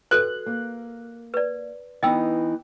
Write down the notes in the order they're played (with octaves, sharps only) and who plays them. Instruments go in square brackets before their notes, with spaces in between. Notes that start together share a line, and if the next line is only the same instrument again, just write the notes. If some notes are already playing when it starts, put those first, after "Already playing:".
[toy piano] F#4 A4 B4 [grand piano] F#6
[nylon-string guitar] A#3
[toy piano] B4 D5
[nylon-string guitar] E3 B3 D#4 [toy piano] D#5 G5 E6